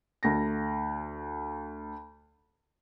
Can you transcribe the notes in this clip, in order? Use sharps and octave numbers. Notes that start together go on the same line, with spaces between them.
D2 A#6